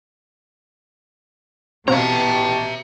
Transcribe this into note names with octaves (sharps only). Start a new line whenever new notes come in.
A1 B2 C4 G4 E5 F5 A5 A#5